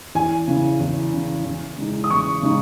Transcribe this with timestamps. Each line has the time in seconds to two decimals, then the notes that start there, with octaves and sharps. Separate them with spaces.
0.15 E2 G#5
0.48 C#3 E3
0.80 E2
1.13 C#3 E3
1.45 E2
1.78 C#3 G#3 D#4
2.04 D#6
2.10 E2 C#6
2.42 C#3 G#3 D#4